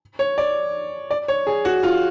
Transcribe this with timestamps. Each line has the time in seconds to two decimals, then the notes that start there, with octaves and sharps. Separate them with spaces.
0.19 C#5
0.38 D5
1.11 D5
1.28 C#5
1.47 G#4
1.65 F#4
1.83 F4